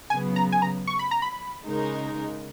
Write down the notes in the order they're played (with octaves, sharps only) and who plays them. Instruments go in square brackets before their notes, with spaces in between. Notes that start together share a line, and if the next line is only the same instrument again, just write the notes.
[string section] C#3 F#3 B3 [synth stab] G#5
[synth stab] A#5
G#5
A#5
C#6
B5
A#5
B5
[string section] C#3 G#3 D#4 A#4